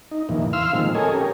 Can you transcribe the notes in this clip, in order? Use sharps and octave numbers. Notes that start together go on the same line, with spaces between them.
D#4
F2 A#2 D#3 E3
F5 C6 E6 F6
A#2 D#3 F3 G#3 C4
A4 A#4 C#5 D#5 G#5
C#4 G4 G#4 A#4